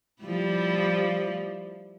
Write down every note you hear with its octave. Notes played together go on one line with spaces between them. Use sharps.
F3 G3 E4